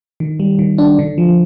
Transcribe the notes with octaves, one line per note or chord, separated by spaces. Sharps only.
D#3
G3
D#3
D4
D3
F3